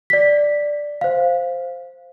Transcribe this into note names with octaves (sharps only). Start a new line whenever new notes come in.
D5 B6
C5 F5